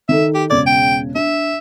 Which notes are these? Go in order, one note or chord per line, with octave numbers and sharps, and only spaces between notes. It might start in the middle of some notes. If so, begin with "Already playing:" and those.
D#3 A4 E5
G4
E1 C#3 D5 G#6
G5
D4 E5